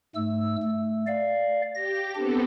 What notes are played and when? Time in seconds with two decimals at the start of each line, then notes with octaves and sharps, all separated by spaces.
0.15 G#2 A3 E6
0.62 A3
1.07 D5 F5
1.74 G4 A#6
2.15 B3 C4 D4 G4 A4